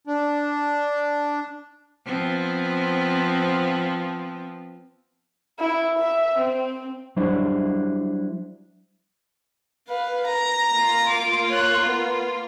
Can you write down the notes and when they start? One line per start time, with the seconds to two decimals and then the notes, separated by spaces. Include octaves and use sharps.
0.07 D4
2.06 F3 B3 C4
5.60 E4
5.99 E5
6.39 C4
7.16 F#3 G3 D4 E4 C5
9.88 B4 F5
10.26 A#5
10.74 A#3 F4
11.08 D6
11.49 C#5 F#6
11.85 B3